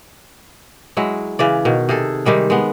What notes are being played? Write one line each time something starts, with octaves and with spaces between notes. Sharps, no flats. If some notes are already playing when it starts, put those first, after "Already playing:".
F#3 G#3 E4
C#3 E3 D5
B2 D#3
C3 G#4 A4
C3 D#3 G3 G#3
G#3 B3